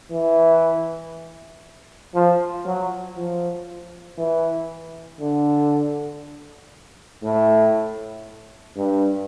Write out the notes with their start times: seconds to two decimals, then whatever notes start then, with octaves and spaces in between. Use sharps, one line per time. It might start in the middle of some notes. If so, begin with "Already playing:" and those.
0.11 E3
2.14 F3
2.65 F#3
3.16 F3
4.18 E3
5.20 D3
7.23 A2
8.76 G2